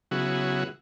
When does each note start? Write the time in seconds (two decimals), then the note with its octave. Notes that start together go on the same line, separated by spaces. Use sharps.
0.11 C#3 F#3 B3 E4 F#4 G#4